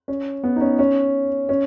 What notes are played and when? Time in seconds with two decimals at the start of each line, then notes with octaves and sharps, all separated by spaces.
0.08 C#4
0.44 B3
0.56 D#4
0.61 C#4
0.79 C#4
1.49 C#4